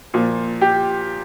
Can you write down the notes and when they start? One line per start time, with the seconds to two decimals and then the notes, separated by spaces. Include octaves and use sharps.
0.14 A#2 F3
0.61 G4